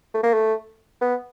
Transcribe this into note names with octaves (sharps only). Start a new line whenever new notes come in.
A3
A#3
A3
B3